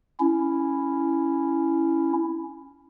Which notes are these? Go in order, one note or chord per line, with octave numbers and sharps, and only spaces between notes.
C#4 E4